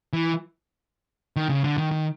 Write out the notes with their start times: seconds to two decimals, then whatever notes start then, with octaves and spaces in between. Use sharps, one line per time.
0.13 E3
1.36 D#3
1.49 C#3
1.64 D3
1.78 D#3
1.91 D#3